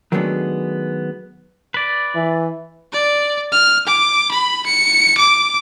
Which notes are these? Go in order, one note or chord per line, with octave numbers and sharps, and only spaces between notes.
D#3 F#3 G#3 A3 B3 D4
B4 D5
E3
D5
F6
D6
B5
C#7
D6